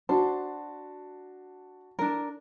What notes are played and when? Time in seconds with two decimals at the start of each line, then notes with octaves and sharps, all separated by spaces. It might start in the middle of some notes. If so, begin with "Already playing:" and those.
0.09 D4 F#4 C5 A5
1.99 D4 A#4